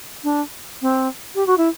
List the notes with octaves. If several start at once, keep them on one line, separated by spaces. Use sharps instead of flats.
D4
C4
G4
F#4
E4